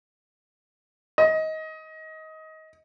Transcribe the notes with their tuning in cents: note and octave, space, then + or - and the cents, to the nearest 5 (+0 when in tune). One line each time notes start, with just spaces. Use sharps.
D#5 +20